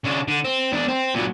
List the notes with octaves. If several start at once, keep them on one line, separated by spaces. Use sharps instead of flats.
C#3 D4
D3
C4
E2 D4
C4
A#2 F#3